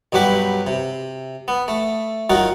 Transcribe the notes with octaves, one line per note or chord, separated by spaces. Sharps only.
B1 G2 F#3 F#4 G4 B5
C3
B3
A3
D#3 F#3 D#4 F4 F#4